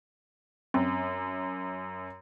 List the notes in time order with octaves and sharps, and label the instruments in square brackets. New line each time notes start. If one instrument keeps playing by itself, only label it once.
[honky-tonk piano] F#2 [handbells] C4